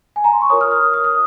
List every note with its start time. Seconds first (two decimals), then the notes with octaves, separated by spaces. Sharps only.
0.16 G#5
0.24 A#5
0.33 C6
0.42 C#6
0.50 F4 A#4 C#5 D#6
0.61 F6
0.71 D#6
0.82 F6
0.94 D#6
1.04 D#6